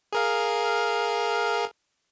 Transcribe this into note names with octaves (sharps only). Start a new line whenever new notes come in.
G#4 A#4 F5